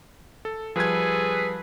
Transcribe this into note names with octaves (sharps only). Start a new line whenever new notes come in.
A4
F3 G3 G#4 A4 B4 G#6